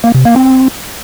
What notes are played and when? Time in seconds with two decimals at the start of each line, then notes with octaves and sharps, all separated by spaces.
0.04 A#3
0.15 C3
0.25 A#3
0.36 C4